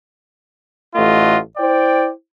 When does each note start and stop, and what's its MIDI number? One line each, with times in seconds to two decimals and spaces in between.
0.96 1.38 33
0.96 1.38 57
0.96 1.38 65
0.96 1.38 75
0.96 1.38 78
1.58 2.09 64
1.58 2.09 72
1.58 2.09 74
1.58 2.09 79